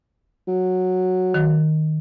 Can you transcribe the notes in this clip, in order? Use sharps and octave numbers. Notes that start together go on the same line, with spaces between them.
F#3
D#3